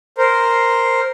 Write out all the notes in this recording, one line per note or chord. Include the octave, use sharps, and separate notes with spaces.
A#4 C5